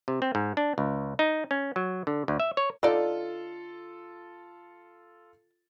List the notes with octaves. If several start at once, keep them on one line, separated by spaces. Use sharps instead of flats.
C3
C4
G#2
D4
C#2
D#4
C#4
F#3
D3
D2
E5
C#5
D3 D#4 F4 A4 D5